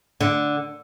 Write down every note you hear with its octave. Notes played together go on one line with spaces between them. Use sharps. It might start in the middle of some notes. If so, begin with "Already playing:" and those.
D3